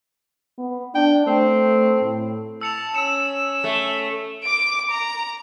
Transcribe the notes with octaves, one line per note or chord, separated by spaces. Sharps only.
B3
D4 G5
A3 C4
A2
A5 E6 C#7 F7
C#4 E6 C#7 E7
A3
D6 D7
A#5